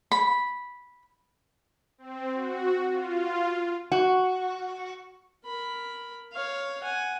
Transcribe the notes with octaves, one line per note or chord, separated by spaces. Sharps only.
B5
C4
F#4
F4
F#4
A#4 B5
C#5 F5
F#5 G#5